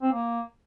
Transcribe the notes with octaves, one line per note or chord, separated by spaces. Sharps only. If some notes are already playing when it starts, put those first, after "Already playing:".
C4
A#3